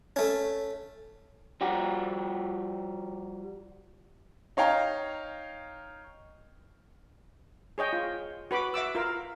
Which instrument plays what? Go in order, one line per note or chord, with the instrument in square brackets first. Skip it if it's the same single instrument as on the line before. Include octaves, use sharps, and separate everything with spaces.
[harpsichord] A3 C#4
[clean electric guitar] F3 G3 F#4 G4
[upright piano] D#4 C#5 F5 G5 A#5
[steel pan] G#4 C#5 D#5 G5
F4
F#4 B4 B5 D6
E5 F#5 D6 E6
F4 A#4 F5